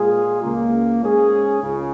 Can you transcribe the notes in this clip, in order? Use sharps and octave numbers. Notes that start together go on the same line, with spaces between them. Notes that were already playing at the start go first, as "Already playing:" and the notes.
Already playing: A#2 G#3 F4 G#4
C#2 C#3 A#3
G#2 G#3 C#4 G#4
C#2 C#3